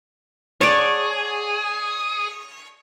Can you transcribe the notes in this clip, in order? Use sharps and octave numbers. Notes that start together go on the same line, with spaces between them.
G#4 C#5 D5 F#5 A5